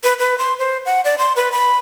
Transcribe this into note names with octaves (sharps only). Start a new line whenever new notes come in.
B4
B4
C6
C5
F#5
D5
C6
B4
B5